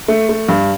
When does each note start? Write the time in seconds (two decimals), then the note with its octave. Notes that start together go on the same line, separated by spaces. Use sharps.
0.08 A3
0.29 A3
0.49 G2